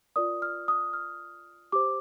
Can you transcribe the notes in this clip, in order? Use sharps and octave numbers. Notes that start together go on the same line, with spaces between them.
F4 A#4 D5 D#6
F6
D#6
F6
G4 C5 D6